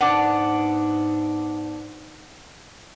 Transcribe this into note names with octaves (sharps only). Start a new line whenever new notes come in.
G#2 B3 D4 D5 F#5